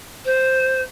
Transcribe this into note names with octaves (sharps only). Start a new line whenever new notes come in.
C5